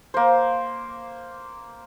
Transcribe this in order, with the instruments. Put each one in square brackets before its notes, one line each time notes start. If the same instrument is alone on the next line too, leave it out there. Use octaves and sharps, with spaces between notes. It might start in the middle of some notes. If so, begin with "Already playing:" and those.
[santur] A#3 C5